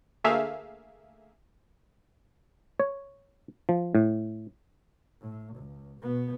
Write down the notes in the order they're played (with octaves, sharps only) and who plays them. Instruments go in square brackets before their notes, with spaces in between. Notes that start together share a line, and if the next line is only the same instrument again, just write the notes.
[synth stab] D2 A3 A#3 G#4 E5 F5
[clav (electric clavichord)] C#5
F3
A2
[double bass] A2
C#2
B2 B3